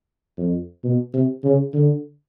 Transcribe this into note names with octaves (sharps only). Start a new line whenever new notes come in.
F2
B2
C3
C#3
D3